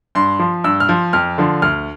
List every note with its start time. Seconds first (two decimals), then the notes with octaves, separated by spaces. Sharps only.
0.15 G2 C6
0.39 F3
0.64 G2 E6
0.80 F6
0.89 F3
1.13 F2 F6
1.38 D3 F3
1.62 D2 F6